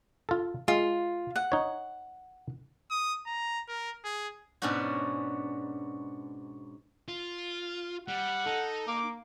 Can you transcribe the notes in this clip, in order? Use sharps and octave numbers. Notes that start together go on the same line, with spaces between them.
F4 A4
G#3 F4
F#5
D#4 C#5
D#6
A#5
A#4
G#4
G#2 B2 B3 C#4 D4 F#4
F4
G3 F#5
D#4 A4
A#3 D6